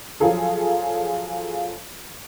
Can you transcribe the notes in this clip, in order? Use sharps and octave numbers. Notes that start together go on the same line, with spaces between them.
F3 F#3 F4 G#4 A4